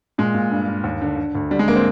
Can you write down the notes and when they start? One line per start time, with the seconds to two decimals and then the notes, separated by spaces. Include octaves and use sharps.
0.18 A#2 G#3
0.34 A#2
0.51 G2
0.68 G2
0.84 D#2
1.02 D3
1.18 D3
1.35 D2
1.51 D3 G3
1.59 G#3
1.68 D3 A#3
1.75 C4